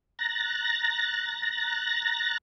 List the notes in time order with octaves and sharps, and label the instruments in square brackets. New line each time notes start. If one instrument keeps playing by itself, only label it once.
[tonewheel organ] A#5 F#6 A6 A#6